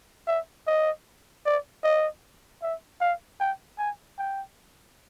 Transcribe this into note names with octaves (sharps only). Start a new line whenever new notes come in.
E5
D#5
D5
D#5
E5
F5
G5
G#5
G5